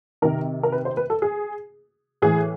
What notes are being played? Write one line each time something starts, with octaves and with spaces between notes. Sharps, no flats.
C3 D#3 A#4
A#4
B4
C5
B4
A4
G#4
A2 E3 G#4